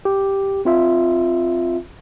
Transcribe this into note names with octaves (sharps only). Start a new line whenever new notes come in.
G4
C4 F4 E5